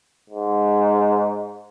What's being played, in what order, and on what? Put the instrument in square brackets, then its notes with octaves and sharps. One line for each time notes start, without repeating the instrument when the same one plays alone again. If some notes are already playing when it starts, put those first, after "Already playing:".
[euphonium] G#2